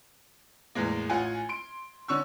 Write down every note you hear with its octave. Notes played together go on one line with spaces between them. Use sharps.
E2 A2 E3 G#3 A#3
A1 F4 F#5 G#5
C6 D7
D3 C#4 C#6 E6